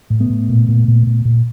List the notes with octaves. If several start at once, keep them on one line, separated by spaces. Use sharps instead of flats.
A2
A3 B3
A2
A#2
A#2
A#2
A#2
A#2